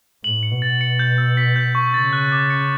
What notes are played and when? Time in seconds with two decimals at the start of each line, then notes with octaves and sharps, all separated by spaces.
0.24 A2 F#7
0.43 C#7
0.52 B2
0.62 A6
0.81 C#7
0.99 G6
1.18 E6
1.37 B6
1.56 G6
1.75 C#6
1.94 C#3 A6
2.13 F#6
2.32 D6
2.50 C#7